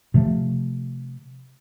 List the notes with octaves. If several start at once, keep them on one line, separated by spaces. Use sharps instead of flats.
C3 F3 A3